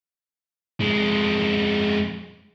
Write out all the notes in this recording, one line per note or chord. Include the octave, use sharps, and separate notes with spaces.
F2 G#3